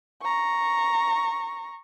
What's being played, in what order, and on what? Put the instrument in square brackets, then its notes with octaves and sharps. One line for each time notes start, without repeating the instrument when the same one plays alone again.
[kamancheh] A#5 C#6